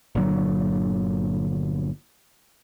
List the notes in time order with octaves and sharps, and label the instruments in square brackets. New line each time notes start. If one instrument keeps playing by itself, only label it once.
[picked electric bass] G1 A#2 D3 F#3